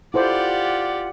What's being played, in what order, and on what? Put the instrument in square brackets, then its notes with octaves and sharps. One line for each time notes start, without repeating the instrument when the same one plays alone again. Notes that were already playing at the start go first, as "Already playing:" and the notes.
[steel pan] E4 A4 C5 [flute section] F4 F#5 [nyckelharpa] G4 D5